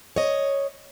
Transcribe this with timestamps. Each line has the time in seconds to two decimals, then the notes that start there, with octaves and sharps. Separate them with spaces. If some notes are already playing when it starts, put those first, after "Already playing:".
0.16 C#5 D#5